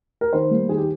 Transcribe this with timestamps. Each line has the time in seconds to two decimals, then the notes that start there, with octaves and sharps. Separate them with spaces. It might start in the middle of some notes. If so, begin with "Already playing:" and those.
0.21 A#4
0.33 D#3 C5
0.51 G3 A#3
0.69 D#3 G#4
0.78 G4